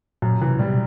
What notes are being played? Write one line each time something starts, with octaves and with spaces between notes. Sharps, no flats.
F#2 A#2
C3 E3
B2 G3